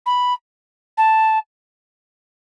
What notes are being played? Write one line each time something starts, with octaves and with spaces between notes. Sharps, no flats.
B5
A5